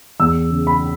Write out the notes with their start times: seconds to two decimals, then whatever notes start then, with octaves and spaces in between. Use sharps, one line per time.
0.20 E2 E6
0.51 C#3
0.67 B5